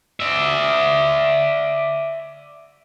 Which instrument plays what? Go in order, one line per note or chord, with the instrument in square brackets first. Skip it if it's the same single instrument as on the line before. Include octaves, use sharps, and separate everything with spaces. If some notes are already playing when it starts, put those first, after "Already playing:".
[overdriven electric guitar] D5 E5